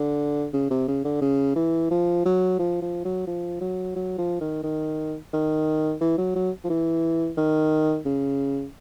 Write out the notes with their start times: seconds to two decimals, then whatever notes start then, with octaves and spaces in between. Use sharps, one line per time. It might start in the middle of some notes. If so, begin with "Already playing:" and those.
Already playing: D3
0.54 C#3
0.71 C3
0.88 C#3
1.05 D3
1.22 C#3
1.56 E3
1.91 F3
2.25 F#3
2.59 F3
2.82 F3
3.05 F#3
3.27 F3
3.61 F#3
3.96 F#3
4.18 F3
4.41 D#3
4.64 D#3
5.33 D#3
6.01 E3
6.18 F#3
6.35 F#3
6.64 F3
6.70 E3
7.37 D#3
8.06 C#3